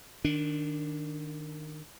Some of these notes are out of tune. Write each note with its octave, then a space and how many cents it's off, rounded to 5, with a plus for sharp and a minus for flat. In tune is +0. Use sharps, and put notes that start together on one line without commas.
D#3 -15 D4 +0